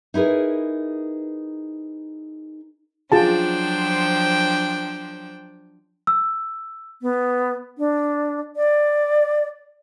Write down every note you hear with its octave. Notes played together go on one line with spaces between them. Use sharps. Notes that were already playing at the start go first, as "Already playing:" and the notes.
D#4 E4 G#4 A#4 B4
F3 F#3 D4 F4 G#4 C5 G5 A5
E6
B3
D4
D5